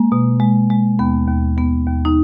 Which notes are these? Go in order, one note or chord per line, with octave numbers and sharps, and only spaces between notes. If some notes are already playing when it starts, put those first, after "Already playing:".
Already playing: G#3 A#3
B2
G#3
G#3
D#2 B3
D#2
D#2 B3
D#2
D#4